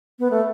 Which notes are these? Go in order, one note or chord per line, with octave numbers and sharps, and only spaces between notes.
B3
A3